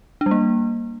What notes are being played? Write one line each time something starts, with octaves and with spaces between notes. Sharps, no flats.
D4
G3
A#3